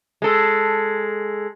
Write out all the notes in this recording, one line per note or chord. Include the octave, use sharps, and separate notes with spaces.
G#3 A4